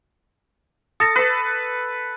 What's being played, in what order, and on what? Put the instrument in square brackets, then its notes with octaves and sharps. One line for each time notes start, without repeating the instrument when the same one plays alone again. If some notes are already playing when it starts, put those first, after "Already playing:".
[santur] A4 [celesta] D#6 A#6 C#7
[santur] B4 E6